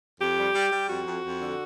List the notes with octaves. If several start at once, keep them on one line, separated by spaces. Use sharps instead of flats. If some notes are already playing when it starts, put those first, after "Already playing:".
F2 G4
G3
G3
G3
F2 F#4
F2
F2
D3